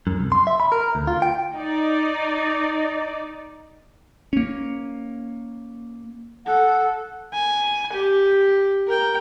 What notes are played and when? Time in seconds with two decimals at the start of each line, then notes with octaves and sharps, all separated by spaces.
0.07 F#2
0.19 C2
0.32 C6
0.47 E5
0.60 B5
0.72 A#4
0.95 D2
1.07 F4
1.22 G5
1.54 D#4 D5
4.33 A#3 C#4
6.46 A4 F#5
7.33 G#5
7.93 G4
8.87 A#4 G5